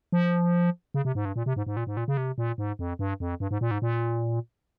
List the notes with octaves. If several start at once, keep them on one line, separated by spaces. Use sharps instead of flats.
F3
C#3
C3
G#2
G2
A#2
C3
G#2
G#2
A#2
G#2
A#2
C#3
C3
A#2
G#2
F2
G2
F2
G2
G#2
A#2
G#2
A#2